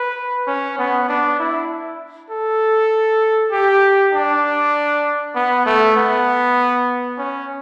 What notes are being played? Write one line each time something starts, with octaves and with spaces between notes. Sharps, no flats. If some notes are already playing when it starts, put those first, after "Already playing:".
Already playing: B4
C#4
B3
D4
E4
A4
G4
D4
B3
A3
B3
C#4